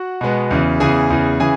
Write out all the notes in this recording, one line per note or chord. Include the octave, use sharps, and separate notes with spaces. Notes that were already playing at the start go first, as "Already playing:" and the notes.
Already playing: F#4 F#5
B2 G#3 B3
E2 C#3 E3
E2 C#3 E3 G#4 G#5
E2 C#3 E3
C#3 E3 G#4 G#5